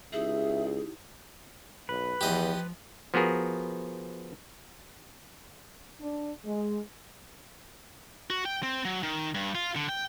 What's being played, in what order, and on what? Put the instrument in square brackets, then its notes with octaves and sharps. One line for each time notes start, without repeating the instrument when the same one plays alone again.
[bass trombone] C#2 [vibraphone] D#4 E4 G4 [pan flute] G#4 [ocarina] E5
[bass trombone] B1 [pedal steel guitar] B4
[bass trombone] E2 [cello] F3 [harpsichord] G4 D#5
[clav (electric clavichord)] F3 B3 F#4 G#4 A#4
[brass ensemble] D4
G#3
[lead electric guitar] F#4
G5
C4
F#3
D#3
G2
F4
D3
G5